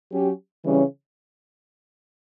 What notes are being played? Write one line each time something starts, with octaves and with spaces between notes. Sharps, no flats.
F#3 C#4 G4
C#3 E3 G3 C#4